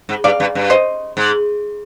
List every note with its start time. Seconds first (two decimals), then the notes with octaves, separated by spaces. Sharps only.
0.09 G#2
0.24 G2 D5 F5
0.40 G2
0.55 G2
0.70 C5 D#5
1.17 G#2